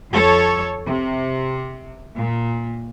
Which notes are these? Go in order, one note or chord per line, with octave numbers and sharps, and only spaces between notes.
F2 A4 C#5
C3
A#2